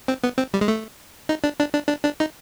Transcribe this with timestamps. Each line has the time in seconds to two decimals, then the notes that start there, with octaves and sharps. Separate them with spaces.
0.08 C4
0.23 B3
0.38 C4
0.54 G3
0.61 G#3
0.68 A3
1.29 D#4
1.44 D4
1.59 D4
1.74 D4
1.89 D4
2.05 D4
2.20 D#4